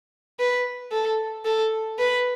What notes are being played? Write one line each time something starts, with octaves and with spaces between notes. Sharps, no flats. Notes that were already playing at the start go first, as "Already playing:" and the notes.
B4
A4
A4
B4